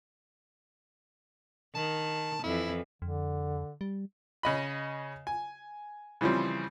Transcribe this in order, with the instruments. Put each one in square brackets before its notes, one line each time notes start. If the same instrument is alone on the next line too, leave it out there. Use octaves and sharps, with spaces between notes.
[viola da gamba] D#3 [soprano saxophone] A5
[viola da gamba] F2 E3 [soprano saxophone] E4
[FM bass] F2 [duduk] D3
[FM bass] G3
[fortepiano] C#3 D#5 B5
G#5
C#3 E3 F3 G3 C4